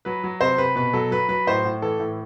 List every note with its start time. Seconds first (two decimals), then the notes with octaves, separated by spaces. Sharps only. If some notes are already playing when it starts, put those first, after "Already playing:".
0.05 F#3 B4
0.24 F#3
0.41 C3 C5
0.58 C3 B4
0.76 B2 B4
0.93 F#3 A4
1.11 F#3 B4
1.29 F#3 B4
1.47 A2 C5
1.65 A2
1.82 E3 A4
1.99 A2